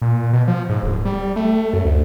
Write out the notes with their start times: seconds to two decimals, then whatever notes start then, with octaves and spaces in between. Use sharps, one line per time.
0.02 A#2
0.33 B2
0.48 F3
0.69 G#2
0.83 D1
1.05 G3
1.36 A3
1.73 F#2
1.85 D2